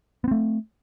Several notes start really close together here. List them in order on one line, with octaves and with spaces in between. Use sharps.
B3 C4 A3